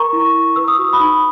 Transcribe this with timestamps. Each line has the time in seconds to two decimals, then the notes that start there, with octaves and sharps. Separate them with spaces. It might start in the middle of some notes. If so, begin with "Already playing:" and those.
Already playing: A#4 A#5 C#6
0.13 E4
0.34 E4
0.56 B4 E6
0.68 D#6
0.78 F#4 C#6
0.93 B5 D#6
1.00 D#4